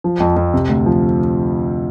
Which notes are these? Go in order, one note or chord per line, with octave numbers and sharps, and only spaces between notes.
F3
F2
F2
C3
D2
F3